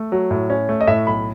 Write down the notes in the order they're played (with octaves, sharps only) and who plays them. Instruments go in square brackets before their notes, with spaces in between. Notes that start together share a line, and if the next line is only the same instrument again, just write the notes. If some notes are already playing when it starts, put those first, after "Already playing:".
Already playing: [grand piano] A3
F#3
A2
C#4
A3
D#5
A2 E5
B1 B5